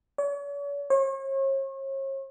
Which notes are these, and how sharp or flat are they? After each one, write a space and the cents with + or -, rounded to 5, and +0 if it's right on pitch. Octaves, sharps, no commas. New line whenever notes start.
C#5 +40
C#5 -40